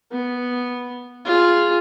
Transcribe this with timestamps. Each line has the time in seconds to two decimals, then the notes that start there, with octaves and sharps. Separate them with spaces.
0.11 B3
1.25 F4 G#4